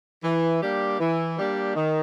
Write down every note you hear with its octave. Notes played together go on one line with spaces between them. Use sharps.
E3
G3 A#3 D4 G4
E3
G3 A#3 D4 G4
D#3